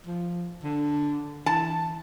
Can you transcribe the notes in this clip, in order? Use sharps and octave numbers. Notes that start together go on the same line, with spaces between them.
F3
D3
E3 A5